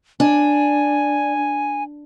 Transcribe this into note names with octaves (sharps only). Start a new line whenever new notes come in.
D4 G#5